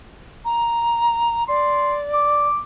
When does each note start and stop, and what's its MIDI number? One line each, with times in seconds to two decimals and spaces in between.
0.45 1.44 82
1.48 2.47 74
1.48 1.94 84
2.13 2.59 86